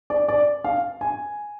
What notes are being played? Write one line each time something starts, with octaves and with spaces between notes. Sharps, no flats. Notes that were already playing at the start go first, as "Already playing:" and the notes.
D5
D5
F5
G#5